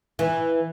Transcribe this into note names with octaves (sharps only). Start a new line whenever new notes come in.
E3